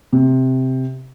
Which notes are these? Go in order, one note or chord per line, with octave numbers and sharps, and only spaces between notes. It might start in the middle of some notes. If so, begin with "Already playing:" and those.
C3